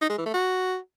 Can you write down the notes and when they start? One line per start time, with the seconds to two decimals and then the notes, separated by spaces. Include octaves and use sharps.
0.02 D#4
0.10 G#3
0.18 E3
0.26 A3
0.34 F#4